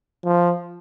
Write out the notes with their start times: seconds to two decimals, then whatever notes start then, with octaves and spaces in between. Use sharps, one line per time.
0.25 F3